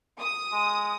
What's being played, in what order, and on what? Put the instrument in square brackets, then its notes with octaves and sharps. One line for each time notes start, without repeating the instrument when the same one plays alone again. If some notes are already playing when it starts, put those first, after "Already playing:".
[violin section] D#6
[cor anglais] G#3